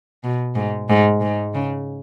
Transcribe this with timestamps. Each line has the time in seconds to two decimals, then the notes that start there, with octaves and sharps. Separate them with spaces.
0.24 B2
0.55 G#2
0.89 G#2
1.21 G#2
1.54 C#3